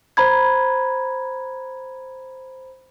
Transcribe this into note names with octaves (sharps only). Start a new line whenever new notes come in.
C5 A#5 B5 G#6